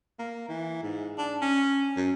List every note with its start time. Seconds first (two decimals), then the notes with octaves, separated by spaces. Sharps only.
0.19 A#3
0.49 E3
0.82 G#2
1.18 D4
1.42 C#4
1.97 F#2